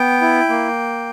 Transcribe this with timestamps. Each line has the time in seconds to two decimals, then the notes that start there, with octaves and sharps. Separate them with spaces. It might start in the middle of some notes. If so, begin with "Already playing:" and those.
Already playing: B3 G5
0.21 E4
0.49 A#3